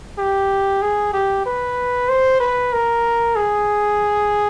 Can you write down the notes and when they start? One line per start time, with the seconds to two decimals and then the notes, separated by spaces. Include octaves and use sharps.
0.18 G4
0.82 G#4
1.13 G4
1.46 B4
2.09 C5
2.40 B4
2.73 A#4
3.36 G#4